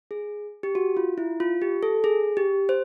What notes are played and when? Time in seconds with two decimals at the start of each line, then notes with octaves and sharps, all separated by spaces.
0.11 G#4
0.63 G4
0.75 F#4
0.97 F4
1.18 E4
1.40 F4
1.62 G4
1.83 A4
2.04 G#4
2.37 G4
2.69 C5